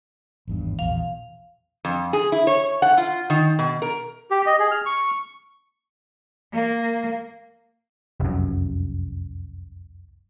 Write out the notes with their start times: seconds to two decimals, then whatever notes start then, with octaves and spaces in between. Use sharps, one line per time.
0.48 G#1 E2 G2
0.79 A#1 E2 B2 F5
1.85 F2
2.13 G#4
2.32 E4
2.47 C#5
2.82 F#5
2.97 F4
3.30 D#3
3.59 B2
3.82 A#4
4.31 G4
4.46 D#5
4.59 G#4
4.71 F6
4.86 C#6
6.53 A#3
8.20 F1 C2 F#2